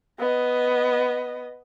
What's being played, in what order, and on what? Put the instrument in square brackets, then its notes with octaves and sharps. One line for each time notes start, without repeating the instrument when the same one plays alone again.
[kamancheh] B3 D#5